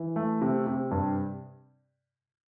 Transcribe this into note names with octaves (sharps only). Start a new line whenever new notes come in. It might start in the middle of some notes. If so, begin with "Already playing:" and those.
Already playing: E3
A3
C3
C3
G2